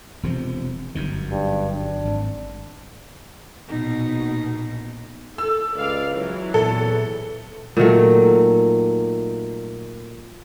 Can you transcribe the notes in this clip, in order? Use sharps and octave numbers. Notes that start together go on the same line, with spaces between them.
E1 C3 F3
G1 F#2 D#3
G2
D4
G#1
A#1 B2 D#4
A4 E6
C#2 D5 F5
E3 F#3
E2 A#2 A4
A#2 D#3 F#3 A3